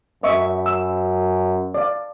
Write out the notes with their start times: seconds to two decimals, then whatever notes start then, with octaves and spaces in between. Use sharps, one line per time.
0.23 F#2 D#5 E5 C#6
0.66 E6
1.74 D5 F5